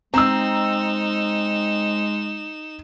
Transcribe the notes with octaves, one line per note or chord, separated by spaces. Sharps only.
G#3 C4 D#4 A#5 E6 E7